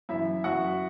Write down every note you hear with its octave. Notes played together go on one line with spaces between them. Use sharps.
F#2 E3 E4 E5
F#2 E3 F#4 F#5